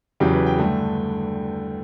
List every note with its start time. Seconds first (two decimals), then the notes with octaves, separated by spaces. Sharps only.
0.20 E2 C#3 F#3 G4
0.33 B4
0.46 G5
0.58 G2 D3 A3